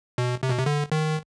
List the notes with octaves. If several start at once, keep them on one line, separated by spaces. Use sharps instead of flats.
B2
C3
B2
C3
D3
D#3